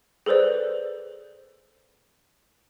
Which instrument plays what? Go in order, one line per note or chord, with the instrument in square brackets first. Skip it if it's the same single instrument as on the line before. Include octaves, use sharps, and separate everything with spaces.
[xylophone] G#4 A4 B4 C5 D5